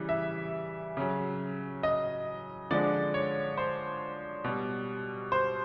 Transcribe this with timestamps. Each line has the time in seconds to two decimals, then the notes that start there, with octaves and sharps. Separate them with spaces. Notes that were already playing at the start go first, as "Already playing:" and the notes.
Already playing: C#3 E3 G3
0.09 E5
0.97 C#3 F#3
1.83 D#5
2.71 D3 F3 G#3 D5
3.14 C#5
3.57 C5
4.44 B2 G3
5.32 C5